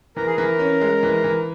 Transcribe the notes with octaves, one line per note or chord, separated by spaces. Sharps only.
E3 A#4
G#4
E3 A#4
C#4
G#3
E3
E3